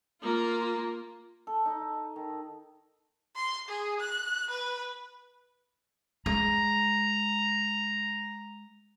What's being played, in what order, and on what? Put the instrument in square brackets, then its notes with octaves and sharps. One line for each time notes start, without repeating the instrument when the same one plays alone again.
[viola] A#3 F4
[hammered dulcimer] A4
D#4
D#3
[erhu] C6
G#4
F#6
B4
[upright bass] G#3 [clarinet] A#5